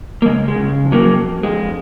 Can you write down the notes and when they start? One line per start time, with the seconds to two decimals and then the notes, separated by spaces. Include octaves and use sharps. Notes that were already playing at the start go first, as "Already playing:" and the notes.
0.22 A#3
0.26 C#3 G#3
0.48 G#3
0.56 C#3
0.85 F2
0.92 F#3 A#3
1.14 F2
1.43 F2 G#3